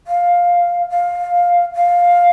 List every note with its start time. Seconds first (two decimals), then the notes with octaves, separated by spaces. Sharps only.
0.07 F5
0.90 F5
1.74 F5